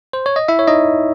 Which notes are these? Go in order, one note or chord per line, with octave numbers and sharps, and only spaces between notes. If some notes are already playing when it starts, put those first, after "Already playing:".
C5
C#5
D#5
E4 E5
C#5
D#4 D#5